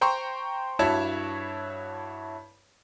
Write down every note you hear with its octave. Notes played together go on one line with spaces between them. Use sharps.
C5 G5 A#5 C6 C#6
G2 E4 F#4 C#5 A5